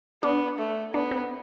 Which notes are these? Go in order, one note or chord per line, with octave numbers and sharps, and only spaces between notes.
B3 D4
A3
B3 D4
C4